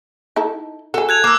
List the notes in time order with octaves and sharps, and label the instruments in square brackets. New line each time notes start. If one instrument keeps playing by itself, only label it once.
[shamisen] D#4 E4 A4
[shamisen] F#4 G#4 [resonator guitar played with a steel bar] A4
[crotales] F#6 G#6 F7
[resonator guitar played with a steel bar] A#3 [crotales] D6 E6